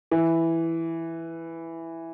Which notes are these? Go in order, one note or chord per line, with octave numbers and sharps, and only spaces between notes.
E3